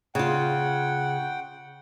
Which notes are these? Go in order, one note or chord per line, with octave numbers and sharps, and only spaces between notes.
C#3 F4 F#5 G5